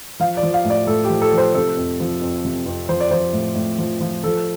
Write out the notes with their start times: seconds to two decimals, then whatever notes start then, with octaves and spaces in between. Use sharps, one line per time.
0.20 F3 F5
0.37 D5
0.43 F3
0.54 F5
0.65 A2
0.70 D5
0.87 A2 A4
1.04 G4
1.10 F3
1.21 A4
1.32 F3
1.38 C5
1.54 C3 A4
1.77 F2
2.00 F3
2.22 F2
2.45 C3
2.66 F2
2.89 F3 C5
3.00 D5
3.11 F3 C5
3.33 A2
3.55 A2
3.78 F3
4.01 F3
4.24 F3 A4